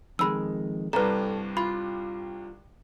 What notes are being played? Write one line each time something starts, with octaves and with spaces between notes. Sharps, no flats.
F2 D#3 G#3 B5 E6
C2 G2 A4 B4 A#5
F4 B5